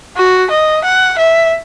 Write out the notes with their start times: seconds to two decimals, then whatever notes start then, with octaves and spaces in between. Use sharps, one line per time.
0.16 F#4
0.50 D#5
0.84 F#5
1.18 E5